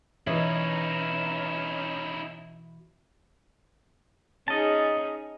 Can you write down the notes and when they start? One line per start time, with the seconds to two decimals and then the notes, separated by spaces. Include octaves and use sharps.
0.27 B2 E3 C#4 D#4 E4 E5
4.48 C#4 D#4 G#4 D#5 A5